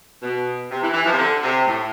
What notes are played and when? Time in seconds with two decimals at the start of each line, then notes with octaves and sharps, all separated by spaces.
0.22 B2
0.71 C3
0.82 E3
0.94 E3
1.06 F3
1.12 C3
1.18 D3
1.43 C3
1.67 A2